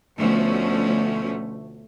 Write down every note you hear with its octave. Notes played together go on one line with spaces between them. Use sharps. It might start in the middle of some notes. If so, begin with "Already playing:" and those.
D2 B2 F3 A3 C#4